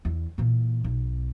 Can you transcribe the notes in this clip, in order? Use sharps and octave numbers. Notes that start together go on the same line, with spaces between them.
E2
A#2 E3
B1